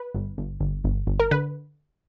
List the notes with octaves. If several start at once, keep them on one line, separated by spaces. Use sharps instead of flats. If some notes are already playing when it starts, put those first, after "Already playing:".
Already playing: B4
G1
G1
G1
G1
G1
A#4
D3 B4